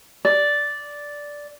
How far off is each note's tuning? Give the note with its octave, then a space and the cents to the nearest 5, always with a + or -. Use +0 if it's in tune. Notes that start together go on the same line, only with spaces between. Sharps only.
D5 -5